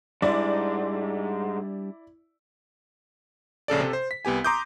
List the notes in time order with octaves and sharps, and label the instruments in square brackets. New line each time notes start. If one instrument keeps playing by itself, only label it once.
[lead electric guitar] F2 G#2 [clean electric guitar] G3 D4 [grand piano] E4 [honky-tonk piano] D5
[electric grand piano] A#1 C#3 A4 D5
C3 A4
C5
B6
C2 B3 G4 G#5
A#5 C6 D6 D#6 G6